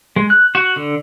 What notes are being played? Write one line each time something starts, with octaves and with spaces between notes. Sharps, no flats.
G#3
F#6
F#4
D3